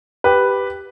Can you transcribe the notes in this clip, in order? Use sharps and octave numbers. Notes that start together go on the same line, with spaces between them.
G4 B4